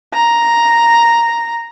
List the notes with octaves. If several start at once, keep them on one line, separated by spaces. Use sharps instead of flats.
A#5